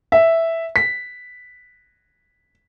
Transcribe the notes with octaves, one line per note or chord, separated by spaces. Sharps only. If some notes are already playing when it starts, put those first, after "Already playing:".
E5
B6